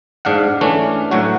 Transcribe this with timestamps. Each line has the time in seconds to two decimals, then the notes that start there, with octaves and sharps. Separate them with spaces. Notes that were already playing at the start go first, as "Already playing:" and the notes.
0.25 G#2 D4 F5 F#5
0.61 E3 A3 C#4 D4
1.11 A2 F#3 F#4